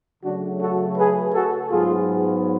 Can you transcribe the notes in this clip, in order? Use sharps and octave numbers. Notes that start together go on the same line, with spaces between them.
C#3 F#3 A3 D4 F#4
F#4 A4
G#4 B4
F#4 A4
G#2 F#3 B3 F4 G#4